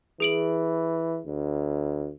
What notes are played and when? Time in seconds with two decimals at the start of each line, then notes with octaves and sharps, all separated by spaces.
0.20 E3 G#4 D7 F#7
1.26 D2